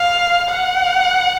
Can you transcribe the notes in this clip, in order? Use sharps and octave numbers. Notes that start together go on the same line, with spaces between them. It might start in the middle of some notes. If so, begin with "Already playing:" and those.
Already playing: F5
F#5